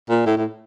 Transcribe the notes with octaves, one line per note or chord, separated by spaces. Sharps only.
A#2
A2
A2